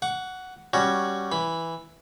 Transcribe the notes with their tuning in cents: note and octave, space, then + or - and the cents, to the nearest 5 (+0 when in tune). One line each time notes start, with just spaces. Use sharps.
F#5 +0 C#6 +40
G3 +0 C#4 +0 F#4 +5
E3 +0 B5 +0